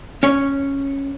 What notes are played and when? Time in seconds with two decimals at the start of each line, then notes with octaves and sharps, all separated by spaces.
0.23 C#4 C#5